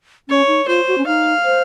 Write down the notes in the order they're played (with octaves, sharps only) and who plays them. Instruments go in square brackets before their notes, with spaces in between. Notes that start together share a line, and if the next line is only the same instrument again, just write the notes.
[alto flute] C#4 [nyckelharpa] C#5
[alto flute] D#4
[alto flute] F4 [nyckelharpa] C5
[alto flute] F#4
C#4
[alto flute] D#4 [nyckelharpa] F5
[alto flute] C5